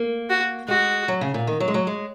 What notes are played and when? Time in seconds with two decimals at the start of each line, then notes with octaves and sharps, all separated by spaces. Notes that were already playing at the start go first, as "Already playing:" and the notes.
Already playing: A#3
0.30 F#4
0.68 G#3 F#4
1.08 F#3
1.21 C#3
1.34 A#2
1.47 D#3
1.60 F#3
1.68 G#3
1.74 F#3
1.87 G#3